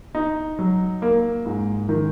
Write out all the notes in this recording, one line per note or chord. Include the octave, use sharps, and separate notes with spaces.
D#4
F#3
A#3
G#2
D#3